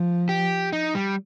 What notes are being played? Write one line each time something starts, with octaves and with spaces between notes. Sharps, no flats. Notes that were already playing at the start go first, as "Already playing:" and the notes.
Already playing: F3
G4
D#4
G3